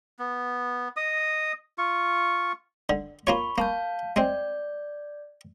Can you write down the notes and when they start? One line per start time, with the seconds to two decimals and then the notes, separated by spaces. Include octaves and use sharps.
0.19 B3
0.96 D#5 D#6
1.78 F4 C#6
2.89 D3
3.27 A#3 F4 C#5 B5 C#6
3.58 A#3 F5 A5 G6
4.16 G#3 C4 D5 G6